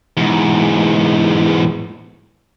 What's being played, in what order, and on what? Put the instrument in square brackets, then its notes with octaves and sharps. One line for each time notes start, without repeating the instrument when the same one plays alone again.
[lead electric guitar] E2 G#2